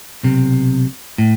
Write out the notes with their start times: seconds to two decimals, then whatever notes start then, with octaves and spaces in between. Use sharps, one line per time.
0.23 B1 C3
1.18 A2